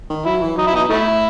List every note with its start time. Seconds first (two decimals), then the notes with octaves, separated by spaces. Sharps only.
0.10 D#3
0.25 F#3 E4
0.42 E3
0.57 F#3 D#4
0.67 E4
0.74 B2 D#4
0.89 A2 A3 E4